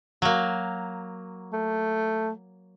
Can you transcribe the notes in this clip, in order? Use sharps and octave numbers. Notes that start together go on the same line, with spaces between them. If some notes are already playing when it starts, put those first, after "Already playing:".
F#3 A#3
A3